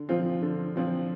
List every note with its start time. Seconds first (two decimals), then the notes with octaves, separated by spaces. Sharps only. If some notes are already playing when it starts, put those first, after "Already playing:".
Already playing: D3
0.09 F3 C4 F4
0.42 D3
0.76 F3 C4 F4